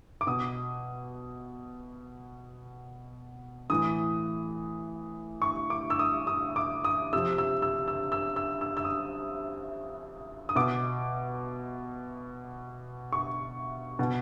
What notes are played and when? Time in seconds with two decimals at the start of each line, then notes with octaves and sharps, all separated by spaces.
0.21 D6
0.27 B2 D#6
3.70 A2 E3 D#6
5.42 C#6
5.70 D6
5.90 E6
5.99 D#6
6.27 D#6
6.56 D6
6.84 D#6
7.13 C3 F3 E6
7.38 E6
7.62 E6
7.88 E6
8.12 E6
8.36 E6
8.61 E6
8.77 E6
8.84 D#6
10.49 D#6
10.56 B2 D6
13.13 C#6
13.99 B2